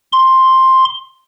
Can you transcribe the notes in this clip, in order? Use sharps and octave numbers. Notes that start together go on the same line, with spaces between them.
C6